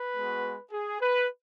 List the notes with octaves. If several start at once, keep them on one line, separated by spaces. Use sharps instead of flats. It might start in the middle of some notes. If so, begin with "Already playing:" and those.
Already playing: B4
G#3 B3 F#4
G#4
B4